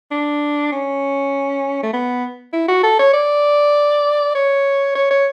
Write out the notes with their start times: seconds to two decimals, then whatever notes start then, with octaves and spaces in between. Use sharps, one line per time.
0.11 D4
0.72 C#4
1.83 A3
1.93 B3
2.53 E4
2.68 F#4
2.83 A4
2.99 C#5
3.14 D5
4.35 C#5
4.95 C#5
5.11 C#5